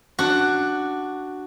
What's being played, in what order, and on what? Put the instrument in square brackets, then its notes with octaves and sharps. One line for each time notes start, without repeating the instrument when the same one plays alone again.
[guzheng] D4 F#4